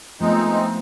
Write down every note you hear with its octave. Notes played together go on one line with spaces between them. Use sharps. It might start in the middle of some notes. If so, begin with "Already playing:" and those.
F3 G#3 A3 B3 C4 D#4